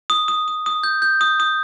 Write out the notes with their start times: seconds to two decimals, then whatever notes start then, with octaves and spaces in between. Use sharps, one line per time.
0.10 D#6
0.28 D#6
0.48 D#6
0.66 D#6
0.83 G6
1.02 G6
1.21 D#6
1.40 D#6